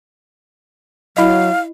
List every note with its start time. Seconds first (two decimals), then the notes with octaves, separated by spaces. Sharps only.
1.17 F#3 E4 D#5 F5